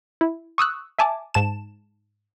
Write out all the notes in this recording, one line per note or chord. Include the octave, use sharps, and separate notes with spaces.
E4
C#6 D#6 E6 F#6
E5 G#5 A5 D6
G#2 A5 E7